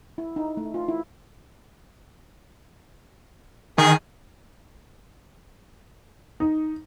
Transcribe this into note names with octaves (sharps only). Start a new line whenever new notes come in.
E4
D#4
A3
F4
E4
D#3 G#4
D#4